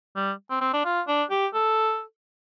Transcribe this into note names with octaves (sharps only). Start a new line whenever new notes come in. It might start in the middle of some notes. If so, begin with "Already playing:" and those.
G3
C4
C4
D4
F4
D4
G4
A4